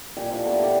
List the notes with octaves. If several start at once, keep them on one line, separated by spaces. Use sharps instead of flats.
A#2 G4 D#5 G#5
F3 D4 E4
A3 B3 A#5 B5
G4 D5 F#5 G5